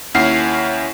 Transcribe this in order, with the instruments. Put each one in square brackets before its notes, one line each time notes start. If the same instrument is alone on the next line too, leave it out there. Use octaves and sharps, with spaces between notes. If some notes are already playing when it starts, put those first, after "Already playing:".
[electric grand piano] D#2 C#4 E4 F#5 F6 C7